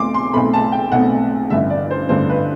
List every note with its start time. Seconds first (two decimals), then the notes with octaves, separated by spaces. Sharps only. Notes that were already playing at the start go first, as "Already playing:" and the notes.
Already playing: B1 B2 A3 C4 C6 D6
0.14 C6
0.33 B1 B2 A3 C4 B5
0.54 A5
0.72 G5
0.92 B1 B2 A3 C4 F#5
1.50 A1 G2 D3 E5
1.70 D5
1.91 C5
2.09 A1 G2 D3 C5
2.29 B4